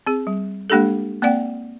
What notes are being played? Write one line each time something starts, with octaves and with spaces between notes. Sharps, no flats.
C4 G#4
G3
G#3 A#3 D4 G4 A4
A#3 C4 D5 F#5 G5